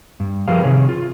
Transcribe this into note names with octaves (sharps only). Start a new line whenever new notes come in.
G2
F3 G4 G#4 A#4 B4 F5
C3 D#3 G#4 C#5
F4